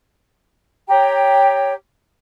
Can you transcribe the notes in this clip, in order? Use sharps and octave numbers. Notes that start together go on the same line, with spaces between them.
G4 C#5 G5 A#5